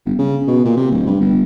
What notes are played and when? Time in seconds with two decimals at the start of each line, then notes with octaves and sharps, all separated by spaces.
0.06 G1
0.18 C#3
0.48 B2
0.65 A#2
0.77 C3
0.91 D1
1.06 G2
1.20 G1